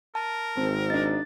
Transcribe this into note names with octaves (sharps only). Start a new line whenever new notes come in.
A#4 A5
G#1 C4
D4 D#4 A6